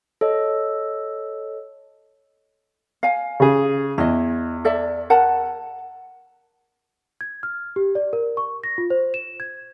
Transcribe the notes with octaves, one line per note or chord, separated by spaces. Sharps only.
A4 C#5 D#5
F5 G#5
C#3 G#4
E2 E4 D#5
A4 D5 E5
A#4 F#5 A5
G#6
F6
G4
D5
A#4
C#6
A#6
F4
C5
E7
G#6